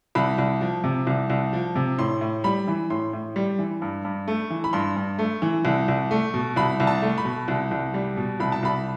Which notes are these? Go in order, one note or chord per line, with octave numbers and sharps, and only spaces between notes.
C2 B5
C2
F3
C3
C2
C2
F3
C3
A2 C6
A2
G3 B5
E3
A2 C6
A2
G3
E3
G2
G2
A3
E3
B5
G2 C6
G2
A3
E3
C2
C2
A3
B2
C2 B5
C2
A5
A3
B5
B2
C2
C2
G3
B2
C2 B5
A5
C2 B5